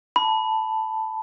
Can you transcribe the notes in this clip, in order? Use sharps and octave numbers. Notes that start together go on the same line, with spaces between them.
A5 B5